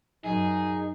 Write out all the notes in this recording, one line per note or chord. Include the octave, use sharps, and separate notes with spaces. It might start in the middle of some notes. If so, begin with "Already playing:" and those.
F#2 D#4 G#4